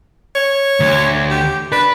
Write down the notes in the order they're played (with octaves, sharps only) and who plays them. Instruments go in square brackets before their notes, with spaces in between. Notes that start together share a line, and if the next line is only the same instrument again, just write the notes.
[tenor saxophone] C#5
[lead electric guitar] D2
[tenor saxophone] G4
[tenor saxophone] D4 [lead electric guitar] B4